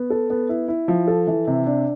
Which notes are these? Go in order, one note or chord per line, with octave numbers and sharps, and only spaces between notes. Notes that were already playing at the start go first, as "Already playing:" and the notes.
Already playing: B3
A4
B3
E4
E4
F3
A4
E3
C3
D4